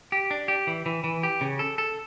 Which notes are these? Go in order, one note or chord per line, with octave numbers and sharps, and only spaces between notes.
G4
D4
G4
E3
E3
E3
G4
C#3
A4
A4